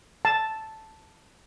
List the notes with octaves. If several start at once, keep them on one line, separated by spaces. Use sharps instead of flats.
A5